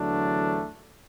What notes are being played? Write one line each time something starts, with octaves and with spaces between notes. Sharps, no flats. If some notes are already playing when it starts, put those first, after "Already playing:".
Already playing: E2 D3 F#3 A3 D4